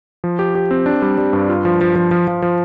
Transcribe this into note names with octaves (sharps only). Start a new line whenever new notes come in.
F3
G4
G4
C4
D4
G3
G3
G2
F4
F3
F3
F3
F3
F3
F3